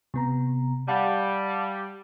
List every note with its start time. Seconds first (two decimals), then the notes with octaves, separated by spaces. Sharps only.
0.14 C3 B3 A#5
0.88 G3 F5 F#5 A5